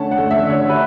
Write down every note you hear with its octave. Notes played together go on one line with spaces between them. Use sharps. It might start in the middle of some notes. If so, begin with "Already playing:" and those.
Already playing: D3 A3 C#4 F#5 A5
F#5
A3
E5
D3
C#5
D3 B4